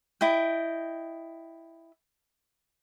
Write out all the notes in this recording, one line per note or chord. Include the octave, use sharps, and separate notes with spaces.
E4 D#5 G5